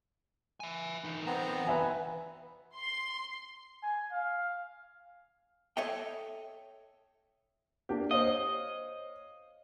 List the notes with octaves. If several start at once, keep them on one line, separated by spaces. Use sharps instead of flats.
E5 G#5
E3 D#4
B3 C4 A#5
B4 E5 G#5
C6
G#5
F5
A4 C#5 D#5 E5 G5
A#3 D4 G4
C5 C#5 D#5 F5